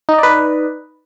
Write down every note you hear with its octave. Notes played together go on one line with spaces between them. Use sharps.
D#4 B4 D5 D#5